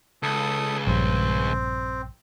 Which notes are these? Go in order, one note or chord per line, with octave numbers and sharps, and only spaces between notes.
C#2 A4 D#6
A#1 G2 C4